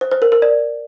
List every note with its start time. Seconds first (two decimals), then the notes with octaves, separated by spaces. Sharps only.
0.01 C5
0.11 C5
0.22 A#4
0.32 A#4
0.42 D5